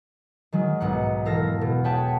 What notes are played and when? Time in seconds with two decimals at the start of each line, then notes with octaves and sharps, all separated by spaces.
0.53 D#3 F#3 G#3
0.80 B1 G#2 F#5
1.25 E1 A4 A#4 F5 A#6
1.61 B2
1.84 G#4 B4 C#5 F#5 G5 A5